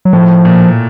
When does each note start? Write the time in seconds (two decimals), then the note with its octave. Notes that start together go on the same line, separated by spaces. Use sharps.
0.05 F#3
0.13 A2 F3
0.45 A#2